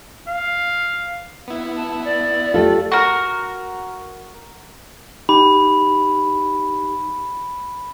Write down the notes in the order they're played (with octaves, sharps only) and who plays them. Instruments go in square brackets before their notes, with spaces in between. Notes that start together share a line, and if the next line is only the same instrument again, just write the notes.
[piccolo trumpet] F5
[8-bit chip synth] B3 E4
[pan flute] A5
D5
[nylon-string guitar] A3 G4 A4 [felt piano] F4
[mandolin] F#4 A#4
[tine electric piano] D#4 G4 [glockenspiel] B5